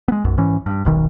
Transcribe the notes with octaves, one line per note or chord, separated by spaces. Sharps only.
G#3 B3
B1 F#2
G#2 E3 C#4
G2
D#1 B1 D#3